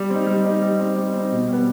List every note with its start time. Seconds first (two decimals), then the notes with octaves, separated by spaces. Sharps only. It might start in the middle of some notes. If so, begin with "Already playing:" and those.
Already playing: G3
0.10 C4 D#4
0.27 G3
0.44 C4 D#4
0.62 G3
0.80 C4 D#4
0.96 G3
1.14 C4 D#4
1.31 B2
1.49 G3 B3